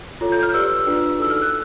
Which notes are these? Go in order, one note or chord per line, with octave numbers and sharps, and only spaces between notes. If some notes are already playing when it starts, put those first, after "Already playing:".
F4 A4 C#5
G6
F6
G4 B4 D5 E6
D4 F4 G#4 B4 D5
D#4 F#4 A4 E6
F6
F#6